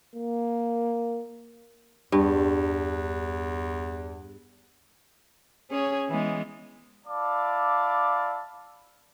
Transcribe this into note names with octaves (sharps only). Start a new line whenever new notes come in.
A#3
E2 G2
C#4 G#4 C#5
E3 G#3 B3
E4 D5 F5 A5 D6